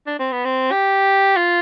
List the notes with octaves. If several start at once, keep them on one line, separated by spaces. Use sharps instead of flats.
D4
C4
B3
C4
G4
F4